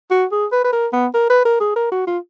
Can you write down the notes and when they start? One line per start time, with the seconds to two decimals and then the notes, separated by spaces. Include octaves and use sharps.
0.11 F#4
0.32 G#4
0.52 B4
0.64 B4
0.73 A#4
0.93 B3
1.14 A#4
1.30 B4
1.45 A#4
1.60 G#4
1.76 A#4
1.92 F#4
2.07 F4